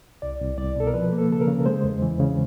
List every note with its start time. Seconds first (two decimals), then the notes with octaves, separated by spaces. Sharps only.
0.22 C2 D5
0.41 C2
0.58 C2 D5
0.76 B2 A4
0.87 A#4
0.94 F3 B4
1.12 A#3
1.18 A4
1.30 C#3 A4
1.41 A#4
1.48 C#3
1.66 G#3 C5
1.84 E2
2.02 E3
2.19 C#3